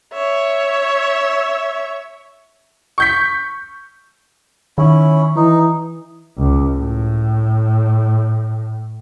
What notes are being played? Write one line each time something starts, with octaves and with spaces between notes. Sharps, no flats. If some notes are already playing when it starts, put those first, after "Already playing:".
C#5 E5
C#6 G6 B6
D#3 C#4 E4
E3 D#4
C#2
A2